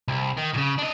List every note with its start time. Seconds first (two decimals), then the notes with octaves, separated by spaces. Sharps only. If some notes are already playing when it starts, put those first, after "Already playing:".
0.08 C2
0.37 D#3
0.54 A#2 C#3
0.78 D4 D#5